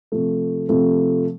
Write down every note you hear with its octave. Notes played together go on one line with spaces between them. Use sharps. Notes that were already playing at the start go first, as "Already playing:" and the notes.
C3 F3 A3
C3 F3 A3